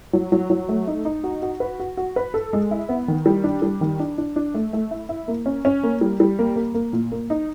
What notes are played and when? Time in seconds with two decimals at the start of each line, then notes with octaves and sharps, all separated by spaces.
0.13 F#3
0.32 F#3
0.50 F#3
0.69 A3
0.87 D#4
1.05 D#4
1.24 F#4
1.42 F#4
1.60 B4
1.80 F#4
1.97 F#4
2.16 B4
2.34 A4
2.53 G#3
2.71 E4
2.89 B3
3.08 D#3
3.26 G3
3.44 D4
3.62 G3
3.81 D#3
3.99 D4
4.18 D4
4.36 D4
4.54 A3
4.73 A3
4.91 E4
5.09 E4
5.28 A#3
5.46 C#4
5.65 C#4
5.83 A#3
6.01 G3
6.20 G3
6.39 A#3
6.56 A#3
6.74 A#3
6.93 A#2
7.12 A#3
7.30 D#4